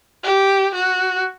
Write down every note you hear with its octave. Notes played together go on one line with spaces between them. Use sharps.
G4
F#4